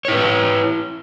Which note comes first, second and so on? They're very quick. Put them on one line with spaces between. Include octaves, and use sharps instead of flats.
C#5 E4 B4